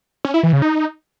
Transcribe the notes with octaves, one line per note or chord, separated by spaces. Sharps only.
C#4
E4
E3
C#3
D#4